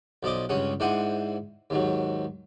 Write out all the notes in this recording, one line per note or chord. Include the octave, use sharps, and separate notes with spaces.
B1 F3 D5 D#5 D6
C#2 G2 C#4 G#4 F#5
G#2 E3 D4 C5 F#5 G#5
D#2 G#2 F#3